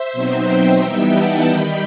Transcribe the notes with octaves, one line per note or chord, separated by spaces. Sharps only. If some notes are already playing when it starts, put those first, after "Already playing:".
Already playing: C5 E5
B2 F#3 C4 D#4
E5 G5
E3 G3 B3 D#4 E5 G5
F#5 A5
D#3 G3 D#4 G5 B5